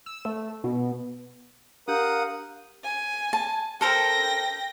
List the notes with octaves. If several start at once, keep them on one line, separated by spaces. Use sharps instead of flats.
E6
A3
B2
D4 G4 A#4 F5 F#5 D#6 G6
G#5
A5
A4 A#4 C5 G5 A#6